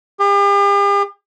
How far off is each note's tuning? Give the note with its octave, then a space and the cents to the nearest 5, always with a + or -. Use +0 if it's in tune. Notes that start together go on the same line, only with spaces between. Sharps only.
G4 +45